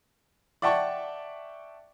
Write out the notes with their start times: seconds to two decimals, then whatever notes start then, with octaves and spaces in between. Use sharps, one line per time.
0.62 D5 E5 F#5 G5 A5 C#6